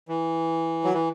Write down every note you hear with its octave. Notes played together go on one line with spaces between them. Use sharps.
E3
F#3
E3